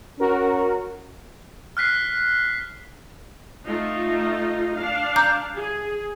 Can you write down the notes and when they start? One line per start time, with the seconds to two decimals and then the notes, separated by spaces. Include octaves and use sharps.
0.20 C#4 F#4 A#4
1.77 F6 F#6 B6 C7
3.66 A3 D#4 F4
4.76 D4 F5
5.16 A#5 D6 G6
5.55 G#4